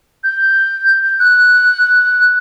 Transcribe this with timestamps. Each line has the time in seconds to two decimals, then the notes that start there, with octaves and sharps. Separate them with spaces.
0.24 G6
1.20 F#6